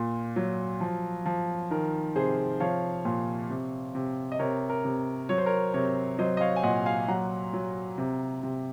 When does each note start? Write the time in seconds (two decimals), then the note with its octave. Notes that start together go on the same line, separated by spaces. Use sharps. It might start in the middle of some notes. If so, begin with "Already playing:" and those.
Already playing: A#2
0.36 F#3
0.81 F3
1.26 F3
1.71 D#3 A#4
2.15 C3 G#4 C5
2.60 F3 C#5 F5
3.05 A#2
3.50 C3
3.95 C3
4.32 D#5
4.39 C3 A#4 C#5
4.69 A#4
4.85 C3
5.29 F#3 C#5
5.38 C5
5.46 A#4 C#5
5.74 C3 A#4 C#5
6.19 F#3 C5 D#5
6.37 D#5
6.41 C#5 F5
6.56 G#5
6.63 A#2 D#5 F#5
6.86 F5 G#5
7.08 F#3 F#5 A#5
7.53 F#3
7.98 C3
8.43 C3